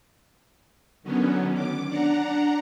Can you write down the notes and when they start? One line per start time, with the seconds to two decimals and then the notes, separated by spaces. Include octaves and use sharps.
1.03 D3 D#3 F#3 B3 C#4
1.54 D6
1.87 D4 F#5 A#5